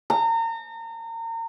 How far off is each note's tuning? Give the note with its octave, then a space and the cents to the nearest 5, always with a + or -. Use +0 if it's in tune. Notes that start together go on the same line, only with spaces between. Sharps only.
A#5 -35